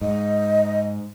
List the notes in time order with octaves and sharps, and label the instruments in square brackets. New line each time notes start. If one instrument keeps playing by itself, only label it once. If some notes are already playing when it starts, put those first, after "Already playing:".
[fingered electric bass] G#2 [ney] D#5